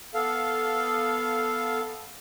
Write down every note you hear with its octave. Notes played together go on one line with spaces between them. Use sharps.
B3 A4 F5